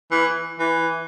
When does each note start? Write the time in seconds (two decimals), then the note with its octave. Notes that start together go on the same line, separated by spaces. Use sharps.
0.11 E3
0.59 E3